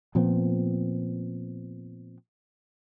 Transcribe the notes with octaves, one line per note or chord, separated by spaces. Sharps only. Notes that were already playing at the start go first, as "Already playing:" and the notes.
A#2 F3 B3 C4